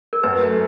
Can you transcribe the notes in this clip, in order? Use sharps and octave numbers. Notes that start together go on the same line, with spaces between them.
A#4
F#2 B4
A3